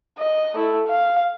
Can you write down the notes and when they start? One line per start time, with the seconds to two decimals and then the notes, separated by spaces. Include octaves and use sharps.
0.19 D#5
0.54 A3 E4
0.87 F5